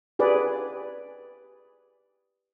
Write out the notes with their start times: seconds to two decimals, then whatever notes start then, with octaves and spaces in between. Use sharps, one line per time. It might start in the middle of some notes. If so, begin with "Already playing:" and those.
0.19 G4 G#4 B4 D5